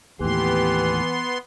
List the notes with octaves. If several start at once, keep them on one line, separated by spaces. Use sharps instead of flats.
D#2 A2 E3 B3 G4 C6